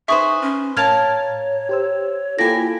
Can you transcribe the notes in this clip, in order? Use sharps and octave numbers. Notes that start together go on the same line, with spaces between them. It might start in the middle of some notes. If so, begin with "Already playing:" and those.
D#4 G#4 B4 C5 E5 C#6 D#6
C#4
A2 A#4 C#5 F5 A5 F6 G#6 F7
G4 C5 E6
A#3 E4 F4 G4 A4 G#5 A#6